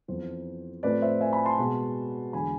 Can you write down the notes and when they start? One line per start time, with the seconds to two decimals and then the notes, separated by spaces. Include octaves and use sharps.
0.08 F2 E3 B3 C5
0.83 A2 F3 A3 C4 B4 D5
1.02 C5 E5
1.21 E5 G#5
1.33 G#5 B5
1.45 A5 C6
1.59 B2 G#3 B3
2.33 E2 D3 G#3 G#5 B5